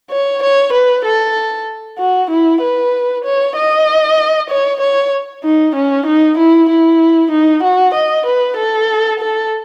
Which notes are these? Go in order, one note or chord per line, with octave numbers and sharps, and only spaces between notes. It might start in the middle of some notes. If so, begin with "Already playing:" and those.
C#5
C#5
B4
A4
F#4
E4
B4
C#5
D#5
C#5
C#5
D#4
C#4
D#4
E4
E4
D#4
F#4
D#5
B4
A4
A4